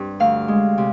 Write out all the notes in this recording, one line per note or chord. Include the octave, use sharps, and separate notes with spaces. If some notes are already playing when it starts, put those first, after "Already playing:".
Already playing: G2 C4
D2 F5
G#3
C3